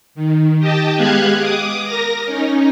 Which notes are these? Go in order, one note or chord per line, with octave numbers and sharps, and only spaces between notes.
D#3
G4 D#5 G5 A5
G#3 B3 G4 F5 F#6 G#6
D6 D#6
A#4 A#6
C#4 D#4